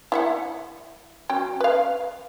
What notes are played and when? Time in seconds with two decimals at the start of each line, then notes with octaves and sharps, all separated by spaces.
0.12 E4 E5 F#5
1.29 F#3 C#4 G5
1.60 B4 F5